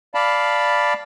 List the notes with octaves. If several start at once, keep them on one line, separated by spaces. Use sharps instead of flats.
D5 F5 A5 B5